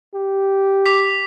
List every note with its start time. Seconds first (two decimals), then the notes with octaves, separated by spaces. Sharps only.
0.14 G4
0.86 D6 B6